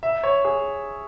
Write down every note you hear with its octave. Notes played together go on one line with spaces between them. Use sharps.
E5
C#5
G#4